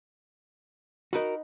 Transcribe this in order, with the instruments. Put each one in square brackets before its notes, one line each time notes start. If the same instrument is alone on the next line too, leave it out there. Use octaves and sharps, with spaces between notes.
[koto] D#4 B4 F#5 [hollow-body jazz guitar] F#4 A#4